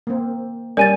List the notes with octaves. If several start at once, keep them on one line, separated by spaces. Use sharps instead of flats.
A#3 C4
G3 C#4 A#4 D5 G#5 A6 D#7